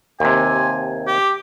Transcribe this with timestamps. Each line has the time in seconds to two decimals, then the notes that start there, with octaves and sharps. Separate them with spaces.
0.20 D#2 C3 G#5
1.07 G4